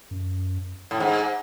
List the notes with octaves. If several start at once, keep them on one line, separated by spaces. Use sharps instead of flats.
F#2
A2
G#2